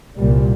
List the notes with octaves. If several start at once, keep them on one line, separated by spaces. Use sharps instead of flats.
C2 A#2 G3